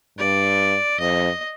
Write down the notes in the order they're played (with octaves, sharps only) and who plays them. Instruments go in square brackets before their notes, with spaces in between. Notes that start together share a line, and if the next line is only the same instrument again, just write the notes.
[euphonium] G2 [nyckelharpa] D5
[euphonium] F2 [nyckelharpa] D#5